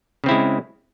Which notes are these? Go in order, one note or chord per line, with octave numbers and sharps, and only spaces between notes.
C#3 G#3 C4 E4